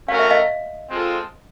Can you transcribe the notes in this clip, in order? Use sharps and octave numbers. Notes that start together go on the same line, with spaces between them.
A3 C#4 F#4 A#4 F5
E5
D#5 F5
G#3 C4 F4 A4